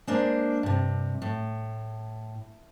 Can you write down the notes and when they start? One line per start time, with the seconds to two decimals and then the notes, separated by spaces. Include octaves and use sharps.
0.07 G#3 A#3 D4 C5
0.63 G2 C3
1.22 A2